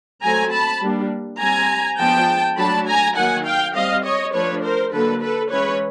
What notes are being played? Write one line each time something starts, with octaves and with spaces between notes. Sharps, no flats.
F#3 A3 C4 G#5 A#5
A5 B5
G3 A#3 D4
G3 C4 G#5 A#5
F3 G#3 B3 D4 G5 A5
F#3 A3 D4 A5 B5
G#5 A#5
D#3 F#3 A#3 F#5 G#5
F5 G5
G3 C4 D#5 F5
C#5 D#5
F3 A3 D4 B4 C#5
A#4 C5
D3 F#3 A#3 A4 B4
A4 B4
E3 G#3 C#4 B4 C#5